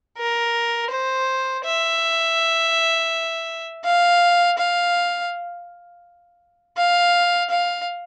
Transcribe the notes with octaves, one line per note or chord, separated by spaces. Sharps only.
A#4
C5
E5
F5
F5
F5
F5